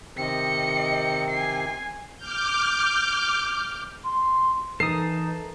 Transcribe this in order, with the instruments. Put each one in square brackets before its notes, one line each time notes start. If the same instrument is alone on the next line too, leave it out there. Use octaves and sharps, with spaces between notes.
[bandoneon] C3 D#3 C4 [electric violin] D#5 C#7
[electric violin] G#5 C7
[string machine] D6 F6 G6
[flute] C6
[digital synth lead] E3 [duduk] D#4 [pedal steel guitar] A4 A#4 D#6 [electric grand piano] C7